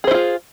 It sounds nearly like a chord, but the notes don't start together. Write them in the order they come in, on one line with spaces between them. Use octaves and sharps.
G#4 C5 E4 F4